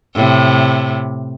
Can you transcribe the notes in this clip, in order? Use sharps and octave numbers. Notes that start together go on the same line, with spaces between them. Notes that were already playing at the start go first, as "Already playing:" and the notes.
A2 C3